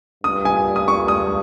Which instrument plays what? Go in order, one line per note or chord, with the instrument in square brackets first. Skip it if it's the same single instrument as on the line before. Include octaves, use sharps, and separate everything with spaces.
[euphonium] G2 [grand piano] D#6
[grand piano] G#5
D#6
C#6
D#6